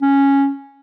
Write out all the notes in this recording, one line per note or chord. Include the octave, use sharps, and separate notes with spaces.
C#4